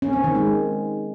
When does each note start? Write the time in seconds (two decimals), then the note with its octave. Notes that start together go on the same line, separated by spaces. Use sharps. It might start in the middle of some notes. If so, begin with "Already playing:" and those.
0.02 C#4
0.13 C4
0.24 D#3
0.35 G#3